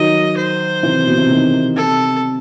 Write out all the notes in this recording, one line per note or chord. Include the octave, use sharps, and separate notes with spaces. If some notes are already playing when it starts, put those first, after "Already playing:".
Already playing: D#3 F#3 D#5
C5
C3 E3
B2
C3
B2 D#3
C3 A4